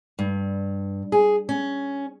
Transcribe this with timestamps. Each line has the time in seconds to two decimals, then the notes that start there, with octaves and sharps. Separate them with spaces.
0.19 G2
1.12 G#4
1.49 C#4